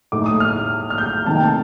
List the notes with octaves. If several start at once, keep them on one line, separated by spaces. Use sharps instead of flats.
A2 A3 D#4 D6
D#6
F6
F6
G6
C3 D#3 A3 D#4 A5
G5
A5